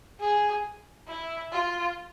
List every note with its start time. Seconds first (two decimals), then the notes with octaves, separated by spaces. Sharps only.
0.20 G#4
1.08 E4
1.52 F4